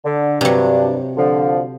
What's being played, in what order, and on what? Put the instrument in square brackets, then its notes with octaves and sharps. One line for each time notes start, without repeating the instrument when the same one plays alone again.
[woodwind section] D3
[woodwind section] G2 D4 [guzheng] C3 F#3
[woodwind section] D3 F3